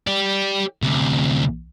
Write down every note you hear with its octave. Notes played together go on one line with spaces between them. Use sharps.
G4 D5
D2 C3